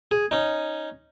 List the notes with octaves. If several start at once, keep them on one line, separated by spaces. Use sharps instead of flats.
G#4
C#4 D#4